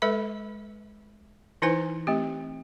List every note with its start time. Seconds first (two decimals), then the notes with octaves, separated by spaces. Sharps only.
0.02 G#3 A4 B4 E5 B5
1.62 E3 D#4 E4 B4 C5 G#5
2.07 A3 C4 G4